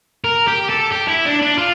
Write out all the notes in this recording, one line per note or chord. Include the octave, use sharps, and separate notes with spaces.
A#4
G4
A4
G4
E4
D4
D4
F4